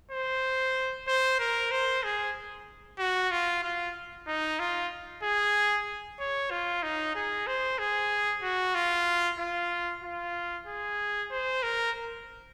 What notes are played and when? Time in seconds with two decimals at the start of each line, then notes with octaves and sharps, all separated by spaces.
0.11 C5
1.07 C5
1.39 A#4
1.71 C5
2.03 G#4
2.99 F#4
3.31 F4
3.63 F4
4.27 D#4
4.59 F4
5.23 G#4
6.19 C#5
6.50 F4
6.83 D#4
7.15 G#4
7.47 C5
7.78 G#4
8.43 F#4
8.75 F4
9.39 F4
10.02 F4
10.67 G#4
11.31 C5
11.62 A#4